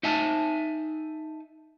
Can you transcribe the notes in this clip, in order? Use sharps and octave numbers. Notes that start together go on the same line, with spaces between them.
D#4 E5 G#5 A5